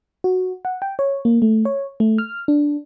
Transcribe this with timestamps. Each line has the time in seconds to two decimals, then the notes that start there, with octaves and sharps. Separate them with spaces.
0.24 F#4
0.65 F#5
0.82 G5
0.99 C#5
1.25 A#3
1.42 A3
1.65 C#5
2.00 A3
2.18 F6
2.48 D4